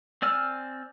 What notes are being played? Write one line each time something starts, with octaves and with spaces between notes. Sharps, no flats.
C4 D5 G#5 E6 F6